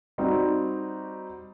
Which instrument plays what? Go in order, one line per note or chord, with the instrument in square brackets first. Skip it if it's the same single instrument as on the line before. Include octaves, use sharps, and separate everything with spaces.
[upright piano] G3 C4 D#4 F#4 G4